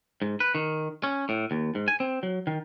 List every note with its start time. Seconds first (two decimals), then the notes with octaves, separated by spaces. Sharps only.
0.22 G#2
0.40 B4
0.55 D#3
1.04 C#4
1.29 A2
1.51 D#2
1.75 G#2
1.88 G#5
2.00 C4
2.23 F#3
2.47 D#3